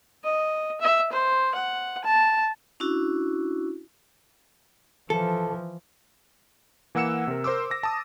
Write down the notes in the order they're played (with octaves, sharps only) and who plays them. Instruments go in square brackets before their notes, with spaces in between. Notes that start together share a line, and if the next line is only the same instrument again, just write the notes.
[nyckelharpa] D#5
E5
C5
F#5
A5
[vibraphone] C#4 D4 E4 F#4
[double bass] E3 F3 [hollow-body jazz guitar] A4
[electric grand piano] E3 A#3 F#5 E6 C#7 E7
C3 A#4
A#4 C5 C6 D6 E6
D6 A#6
A5 D#6